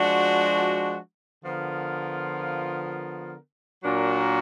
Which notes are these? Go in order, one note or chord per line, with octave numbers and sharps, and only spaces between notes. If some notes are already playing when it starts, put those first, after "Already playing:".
Already playing: F3 G#3 D4 F#4
D3 F3 B3 F4 A#4
A#2 F#3 D4 F#4 A#4